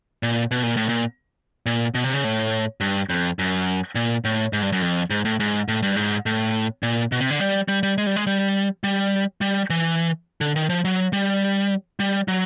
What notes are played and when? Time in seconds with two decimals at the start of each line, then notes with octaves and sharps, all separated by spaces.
0.23 A#2
0.51 B2
0.63 A#2
0.77 A2
0.89 A#2
1.66 A#2
1.95 B2
2.04 C3
2.14 C#3
2.24 A2
2.81 G2
3.10 F2
3.39 F#2
3.95 A#2
4.25 A2
4.53 G#2
4.62 G2
4.72 F#2
4.82 F2
5.10 G#2
5.25 A2
5.40 G#2
5.68 A2
5.83 G2
5.96 G#2
6.26 A2
6.83 A#2
7.12 B2
7.20 C3
7.31 D3
7.40 G3
7.68 G3
7.83 G3
7.98 G#3
8.06 G3
8.16 G#3
8.27 G3
8.84 G3
9.41 G3
9.70 E3
10.41 D3
10.56 D#3
10.70 F3
10.85 F#3
11.13 G3
12.00 G3
12.28 F#3